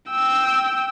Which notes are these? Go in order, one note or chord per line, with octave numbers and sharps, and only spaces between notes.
G5 E6